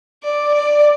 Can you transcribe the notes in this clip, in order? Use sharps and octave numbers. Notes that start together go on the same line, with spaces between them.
D5
D5